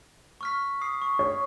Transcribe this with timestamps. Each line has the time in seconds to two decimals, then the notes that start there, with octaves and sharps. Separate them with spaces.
0.41 C#6 F6 B6
0.81 D#6 C7
1.02 C#6
1.19 C#5